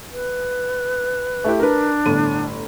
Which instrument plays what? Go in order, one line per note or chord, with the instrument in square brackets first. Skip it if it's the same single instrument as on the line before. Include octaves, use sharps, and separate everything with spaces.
[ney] B4
[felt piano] A3 E4 G4
[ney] D4 [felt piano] A#4 B4
[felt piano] G1 A2 D#7